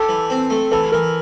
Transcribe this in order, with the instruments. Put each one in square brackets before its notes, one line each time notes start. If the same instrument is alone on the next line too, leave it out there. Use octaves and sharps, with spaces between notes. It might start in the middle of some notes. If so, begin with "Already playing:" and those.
Already playing: [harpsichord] G4 [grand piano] A4
[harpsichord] E3
C4
A3
[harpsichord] E3 [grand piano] A4
[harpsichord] E3 [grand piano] A#4